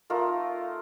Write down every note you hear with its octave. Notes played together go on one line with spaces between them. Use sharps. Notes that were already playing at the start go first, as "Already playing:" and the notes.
A3 D#4 F4 A#4